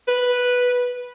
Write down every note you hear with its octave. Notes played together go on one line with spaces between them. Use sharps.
B4